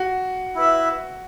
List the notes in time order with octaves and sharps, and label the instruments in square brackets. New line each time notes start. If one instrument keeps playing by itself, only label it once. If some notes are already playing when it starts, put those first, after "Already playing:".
Already playing: [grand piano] F#4
[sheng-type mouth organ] E4 B4 E5